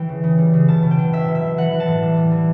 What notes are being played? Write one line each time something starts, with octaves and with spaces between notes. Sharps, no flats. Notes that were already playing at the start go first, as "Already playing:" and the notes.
Already playing: E3 G5
C#3
C#3
G3
C#3
B2 A5
B2
G5
F#3
F#3 E5
B2
E5
F#3
E3 F#5
E3
A5
A2
G3
G3
E3